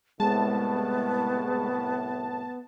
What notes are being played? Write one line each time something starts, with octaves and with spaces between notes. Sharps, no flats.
C2 A2 G#3 B3 A5